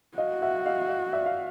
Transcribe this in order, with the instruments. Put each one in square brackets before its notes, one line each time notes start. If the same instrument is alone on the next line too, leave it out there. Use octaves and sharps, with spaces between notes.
[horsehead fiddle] F#4 [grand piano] D#5 F5
[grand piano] E5 F#5
D#5 F5
D#5 F5
D5 E5
F5